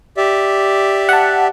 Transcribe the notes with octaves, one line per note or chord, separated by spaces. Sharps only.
G4 D5 E5
F#5 A5